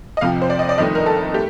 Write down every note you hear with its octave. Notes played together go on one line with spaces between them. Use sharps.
D#5
F2 C3 F3 F5
C5
D5
D#5
D5
G1 F2 D#3 A3 D#5
A#4
A4
A3 G4